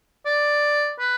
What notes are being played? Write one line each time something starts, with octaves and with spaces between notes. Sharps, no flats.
D5
B4